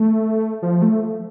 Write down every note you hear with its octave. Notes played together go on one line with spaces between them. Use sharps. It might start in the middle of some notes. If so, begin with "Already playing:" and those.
Already playing: A3
F3
A3